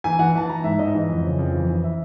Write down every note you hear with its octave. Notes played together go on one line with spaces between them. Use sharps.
E3 G#5
E3 F#5
E3 A5
E3 A#5
G#2 E5
G#2 D#5
E3
F2
C#3
F2
E3
E3
E5